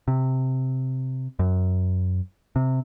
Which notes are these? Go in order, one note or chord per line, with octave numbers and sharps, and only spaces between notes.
C3
F#2
C3